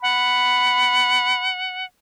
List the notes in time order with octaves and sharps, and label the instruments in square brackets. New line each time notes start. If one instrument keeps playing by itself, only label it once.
[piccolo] F#5 [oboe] B5